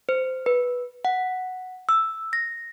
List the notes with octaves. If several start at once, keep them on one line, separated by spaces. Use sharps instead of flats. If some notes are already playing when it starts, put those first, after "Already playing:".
C5
B4
F#5
E6
A#6